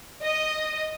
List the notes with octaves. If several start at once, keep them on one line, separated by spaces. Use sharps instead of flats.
D#5